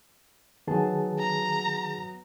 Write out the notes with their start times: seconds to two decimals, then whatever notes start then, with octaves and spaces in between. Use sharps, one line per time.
0.67 D#3 F#3 B3 G#4 A5
1.19 A#5